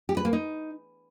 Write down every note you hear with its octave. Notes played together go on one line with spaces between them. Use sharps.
G4
B4
A#3
D#4